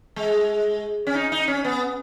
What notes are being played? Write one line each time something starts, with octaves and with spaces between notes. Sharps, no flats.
G#3
C#4
D#4
D#4
C#4
B3